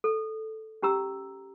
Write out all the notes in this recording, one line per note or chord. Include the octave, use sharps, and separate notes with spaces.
A4
C#4 G4 A#5 E6